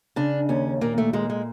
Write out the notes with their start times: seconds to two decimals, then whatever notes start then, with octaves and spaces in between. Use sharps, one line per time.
0.16 C#3 D4
0.49 D#2 C#4
0.81 A#2 A#3
0.98 A3
1.13 A#2 G#3
1.30 G#3